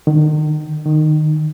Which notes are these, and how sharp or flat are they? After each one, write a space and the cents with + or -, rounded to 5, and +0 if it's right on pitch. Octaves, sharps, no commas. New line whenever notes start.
D#3 -35
D#3 -20